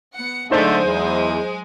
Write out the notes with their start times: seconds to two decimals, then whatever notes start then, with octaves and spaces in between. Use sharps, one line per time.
0.14 B3 F#5 C#7
0.51 D3 F#3 G#3 A3 D#4 G#4 C5
0.85 E2